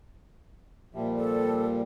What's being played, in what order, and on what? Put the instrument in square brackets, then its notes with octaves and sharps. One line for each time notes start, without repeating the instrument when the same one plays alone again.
[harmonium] A#2 F3 G3 [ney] E5
[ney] A4